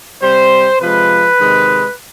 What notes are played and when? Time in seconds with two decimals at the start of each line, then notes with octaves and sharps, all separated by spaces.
0.22 C3 G3 C5
0.80 C3 F3 G#3 B4
1.38 C3 D#3 G#3